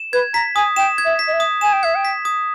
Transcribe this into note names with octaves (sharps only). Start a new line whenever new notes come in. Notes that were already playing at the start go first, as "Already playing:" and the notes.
Already playing: E7
B4 G#6
A#5 B6
G#5 D#6
G5 E7
G#6
E5
B6
D#5
E5
D#6
G#5 E7
G5
E5 G#6
G5
B6
D#6